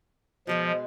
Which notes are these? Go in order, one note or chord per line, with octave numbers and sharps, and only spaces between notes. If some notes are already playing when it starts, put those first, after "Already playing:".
B2 F3 G#3 G#4